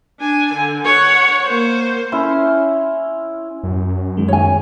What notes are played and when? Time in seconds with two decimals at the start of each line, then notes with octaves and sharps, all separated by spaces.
0.20 D4 G#5
0.54 D3
0.85 C#5 F#5
1.45 A#3 C5
2.12 C#4 E4 C6
3.64 F#2
4.17 D#3 G#3
4.28 C#5 G#5